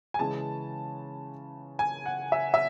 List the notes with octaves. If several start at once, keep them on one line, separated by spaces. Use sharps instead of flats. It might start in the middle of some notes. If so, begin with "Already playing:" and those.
G#5
C#3 E3 G#3 A5
G#5
F#5
E5
E5